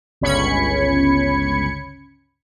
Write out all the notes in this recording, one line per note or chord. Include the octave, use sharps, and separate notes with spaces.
G1 C#2 C#4 B5 G#6 C#7